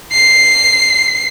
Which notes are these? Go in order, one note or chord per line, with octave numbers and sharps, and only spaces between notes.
C7